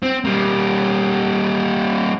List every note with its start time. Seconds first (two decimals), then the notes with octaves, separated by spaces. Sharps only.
0.03 C4
0.25 G3 A#3